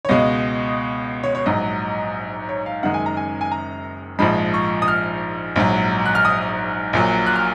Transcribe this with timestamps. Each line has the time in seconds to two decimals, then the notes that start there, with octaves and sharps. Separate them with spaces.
0.05 C#5
0.09 C#2 B2 G#3 D#5
1.23 C#5
1.35 C#5
1.46 A#1 G#2 F#3 D#5
2.49 C#5
2.66 F5
2.83 F#1 F#2 D#3 G#3 F#5
2.94 G#5
3.06 A#5
3.17 G#5
3.41 G#5
3.51 A#5
4.19 A#1 G#2 F3 G#3 B5
4.54 C#6
4.82 D#6
4.88 F6
5.56 A#1 G#2 F#3
6.06 F#6
6.15 F6
6.25 D#6
6.93 A#1 A#2 F#3
7.27 F#6
7.36 F6